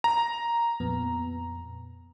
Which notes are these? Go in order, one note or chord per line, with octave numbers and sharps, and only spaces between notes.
A#5
F2 A#2 B3